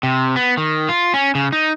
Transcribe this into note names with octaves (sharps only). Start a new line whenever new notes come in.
C3
B3
D#3
F4
C#4
C#3
D#4